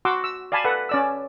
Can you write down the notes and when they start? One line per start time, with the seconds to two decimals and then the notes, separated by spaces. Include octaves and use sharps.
0.05 F#4 F#5 C6 D6 E6
0.24 E6
0.52 D5 F5 G#5 A5 B5
0.65 A4 B4 F#5
0.89 C#4 D5 E6